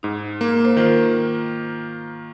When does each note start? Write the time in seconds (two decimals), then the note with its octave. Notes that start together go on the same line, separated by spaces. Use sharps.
0.03 G#2 D#4
0.41 A#3
0.65 C5
0.77 D#3 F4 A#4